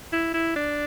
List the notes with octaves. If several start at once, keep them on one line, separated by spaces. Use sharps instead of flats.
E4
E4
D4